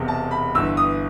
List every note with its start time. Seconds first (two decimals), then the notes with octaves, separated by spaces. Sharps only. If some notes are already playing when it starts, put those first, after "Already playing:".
Already playing: E1 E2 C3
0.08 A5
0.31 B5
0.55 G1 G2 E3 E6
0.77 D#6